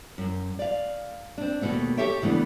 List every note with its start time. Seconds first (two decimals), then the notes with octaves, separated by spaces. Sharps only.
0.18 F#2
0.59 D5 F5
1.38 C4 D4
1.62 D#2 G#2 B2 A3 B3
1.97 G4 A4 C#5 E5 G5
2.22 C#3 E3 A3 B3 D4